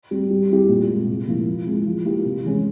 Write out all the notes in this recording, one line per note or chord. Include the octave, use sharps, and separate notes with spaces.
G3 C4
G3
C4 E4 G4
A#2
G#3 C4
C3
F3 A#3 E4
F3
G#3 C4 E4
F3
A#3 E4 G4
C3
E3 G#3 C#4